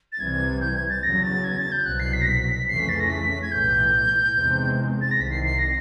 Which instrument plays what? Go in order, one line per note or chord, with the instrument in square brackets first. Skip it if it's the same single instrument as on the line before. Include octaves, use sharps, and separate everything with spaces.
[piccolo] A6
[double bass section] C2 C3 E3 G3 [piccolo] G#6
[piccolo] G6
G#6
A6
[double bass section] E2 C#3 F#3 [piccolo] A#6
[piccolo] A6
G#6
A6
G6
[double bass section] C2 B2 F#3 [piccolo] F#6
[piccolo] C7
B6
A#6
B6
[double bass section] F2 C#3 E3 A3 C#4 [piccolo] C7
[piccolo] B6
A6
A#6
B6
G#6
[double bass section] B1 A2 E3 [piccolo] G6
[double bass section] E2 C3 D#3 G#3 C4
[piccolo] A6
A#6
[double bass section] C2 C3 D#3 [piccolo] B6
[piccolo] C7
C7
A#6